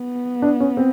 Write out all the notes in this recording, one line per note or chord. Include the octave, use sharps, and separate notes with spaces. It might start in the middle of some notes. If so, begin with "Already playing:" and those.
Already playing: B3
D4
C#4
C4